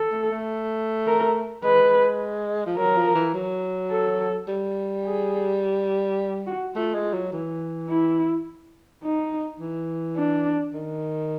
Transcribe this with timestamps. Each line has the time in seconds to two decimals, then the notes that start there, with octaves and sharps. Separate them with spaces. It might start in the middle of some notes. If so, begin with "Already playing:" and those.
Already playing: A4
0.12 A3
0.31 A3
1.07 A#4
1.64 G#3 B4
2.66 F3
2.78 F#3 A#4
2.97 F3
3.15 E3
3.34 F#3
3.91 A4
4.48 G3
5.05 G#4
6.47 F#4
6.75 A3 F4
6.95 G#3
7.14 F#3
7.33 E3
7.89 E4
9.03 D#4
9.60 E3
10.17 D4
10.73 D#3